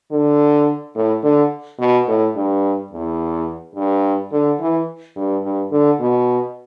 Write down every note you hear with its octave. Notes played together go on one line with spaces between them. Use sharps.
D3
A2
D3
B2
A2
G2
E2
G2
D3
E3
G2
G2
D3
B2